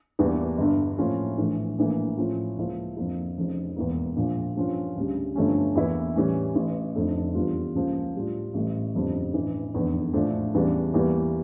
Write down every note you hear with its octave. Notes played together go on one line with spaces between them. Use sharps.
E2 E3 G3 A#3 D4
G1 G2 D3
A2 F3 A#3 C#4 F4
A#1 A2 E3
A#1 A2 E3 A#3
A2 F3 C#4 F4
C#2 C#3 F3 A#3 E4
F2 D3 F3 A#3 E4
F1 F2 C#3
E1 E2 E3 A#3
A#1 A#2 F3
G2 F3 C#4 F4
D2 C#3 G3
G1 G2 F3 A3 C#4
E2 E3 A#3 E4
A2 E3 G3 C#4
A1 A2 E3
F1 F2 D3 A3
E2 D3 G3 D4 F4
C#2 C#3 F3 A#3
A2 G3 D4 F4
A1 A2 G3
G1 F2 C#3 G3
A1 G2 E3
F1 E2 D3
A#1 A2 F3 A3 D4
E2 C#3 E3 G3 D4
E2 E3 G3 A#3